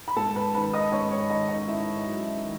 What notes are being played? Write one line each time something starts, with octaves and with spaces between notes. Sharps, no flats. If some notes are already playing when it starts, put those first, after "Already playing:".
B5
G#2 A4 A5
B4 B5
D#3 B4 B5
D#5 D#6
G#2 C#5 C#6
C#5 C#6
D#3 D#4 D#5
D#4 D#5
G#2 E4 E5
F#3
D#3